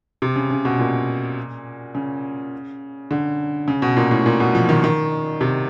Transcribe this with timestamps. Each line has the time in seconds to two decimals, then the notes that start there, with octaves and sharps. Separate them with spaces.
0.22 C3
0.36 C#3
0.51 C#3
0.65 B2
0.79 A#2
1.95 C#3
3.11 D3
3.68 C#3
3.82 B2
3.97 A#2
4.11 A2
4.26 A#2
4.40 B2
4.55 F3
4.69 D#3
4.84 D#3
5.41 C3